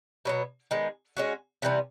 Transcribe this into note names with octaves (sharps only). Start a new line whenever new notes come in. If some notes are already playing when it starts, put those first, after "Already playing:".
B2 F#3 B3
D#3 G#3 B3
G#3 C#4 F#4
C3 E3 G3 B3